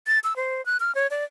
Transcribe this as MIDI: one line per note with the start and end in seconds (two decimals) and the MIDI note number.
0.07 0.19 93
0.24 0.36 88
0.36 0.64 72
0.66 0.77 90
0.80 0.94 89
0.95 1.07 73
1.11 1.24 74